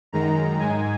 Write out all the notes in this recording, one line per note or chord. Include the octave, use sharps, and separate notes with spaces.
F#2 D#3 G#3 A#5
G#2 G#3 G#5